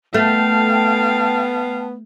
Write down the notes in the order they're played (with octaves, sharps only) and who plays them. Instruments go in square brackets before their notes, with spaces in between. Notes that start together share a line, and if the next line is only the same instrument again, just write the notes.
[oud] A3 [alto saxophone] B3 [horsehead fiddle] F5 [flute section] G5 A5